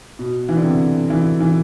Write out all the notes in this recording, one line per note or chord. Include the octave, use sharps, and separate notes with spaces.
B2
E3
D3
C3
E3
E3